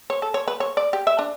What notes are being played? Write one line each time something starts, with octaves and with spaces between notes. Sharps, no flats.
C#5
A4
C#5
B4
C#5
D5
G4
E5
D4